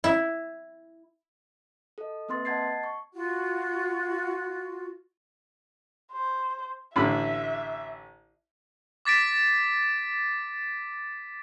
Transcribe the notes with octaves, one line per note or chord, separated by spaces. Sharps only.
E4
A4 D#5
A#3 C4 B4 C6 A6
D#5 F#5 A5 G#6 A6 C7
C#6
F4 F#4
C5
A1 D3 E5 B5
D6 A6 B6 D7